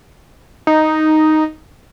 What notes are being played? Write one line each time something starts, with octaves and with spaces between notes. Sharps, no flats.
D#4